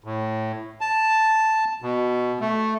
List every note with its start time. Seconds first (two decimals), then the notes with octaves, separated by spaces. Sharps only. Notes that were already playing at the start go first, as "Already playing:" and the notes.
0.04 A2
0.81 A5
1.82 B2
2.40 A3